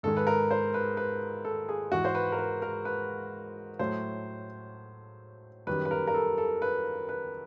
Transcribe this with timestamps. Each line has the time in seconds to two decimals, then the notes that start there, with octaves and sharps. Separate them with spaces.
0.03 G#2 D#3 G#3 A4
0.17 B4
0.27 A#4
0.51 C5
0.74 B4
0.97 B4
1.45 A4
1.69 G#4
1.92 G#2 E3 G#3 F#4
2.05 C5
2.15 B4
2.32 A#4
2.38 B4
2.62 A#4
2.85 B4
3.79 A2 F#3 A3 C5
5.67 F#2 D#3 G3 B4
5.85 B4
5.91 A#4
6.07 A#4
6.14 A4
6.38 A4
6.62 B4
7.09 B4